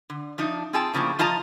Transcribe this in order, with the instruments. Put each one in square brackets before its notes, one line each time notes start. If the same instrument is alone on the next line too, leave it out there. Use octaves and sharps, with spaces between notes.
[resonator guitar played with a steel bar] D3
F3 D4 D#4
C4 F4 G#4 G5 A5
A2 C#3 F3 A#3 D4
F3 F4 D#5 A5 A#5